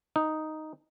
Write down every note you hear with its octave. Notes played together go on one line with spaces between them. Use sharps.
D#4